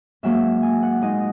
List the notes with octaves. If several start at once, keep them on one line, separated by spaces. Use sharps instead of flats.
G#2 F#3 A#3 E5
G#5
F#5
A#2 G#3 D#4 D#5